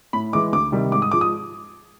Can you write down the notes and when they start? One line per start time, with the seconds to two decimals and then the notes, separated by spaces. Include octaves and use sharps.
0.13 A2 B5
0.33 E3 G#3 D6
0.52 D2 D6
0.72 C3 D#3 G3
0.92 G#2 D6
1.02 D#6
1.11 F3 G#3 D6
1.21 D#6